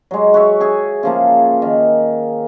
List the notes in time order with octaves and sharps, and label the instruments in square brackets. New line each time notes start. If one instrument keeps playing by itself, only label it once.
[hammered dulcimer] F#3 G#3
F#4 C#5 E5
G#4 E5 G#5
C#3 F3 A#3
D#3